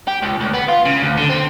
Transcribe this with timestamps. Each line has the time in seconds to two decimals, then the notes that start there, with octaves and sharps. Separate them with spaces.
0.08 G4
0.23 C#2
0.40 D2
0.54 B3
0.68 F4
0.85 C#3
1.02 D2
1.17 D3
1.29 C4